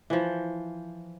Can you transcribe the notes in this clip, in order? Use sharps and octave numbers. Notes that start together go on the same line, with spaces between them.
E3 F3